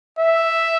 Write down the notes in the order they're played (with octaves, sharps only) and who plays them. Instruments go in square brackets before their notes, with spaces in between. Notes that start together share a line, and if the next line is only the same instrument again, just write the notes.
[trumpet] E5